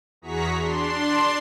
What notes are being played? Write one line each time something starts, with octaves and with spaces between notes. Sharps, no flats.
E2 F#4 G#4 A#5 C#6 B6
D4 C6